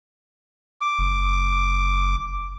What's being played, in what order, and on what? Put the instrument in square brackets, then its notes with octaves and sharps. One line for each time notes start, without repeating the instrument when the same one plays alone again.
[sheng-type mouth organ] D6
[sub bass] F#1